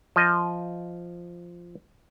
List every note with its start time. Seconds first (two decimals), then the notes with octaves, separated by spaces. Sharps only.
0.16 F3 D#5